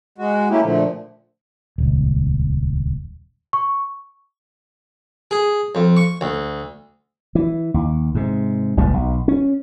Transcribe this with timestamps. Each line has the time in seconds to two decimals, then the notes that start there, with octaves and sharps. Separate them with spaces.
0.18 G#3 F#4
0.50 A3 A#3 C#4 E4 G4
0.63 A#2 D3 F3 A3
1.78 D#1 C#2
3.53 C#6
5.31 G#4
5.75 F2
5.97 C#6
6.21 D2
7.35 E3
7.74 D#2
8.15 G#2 C3
8.77 F#1 C#2 A#2 G3
8.94 B1
9.28 C#4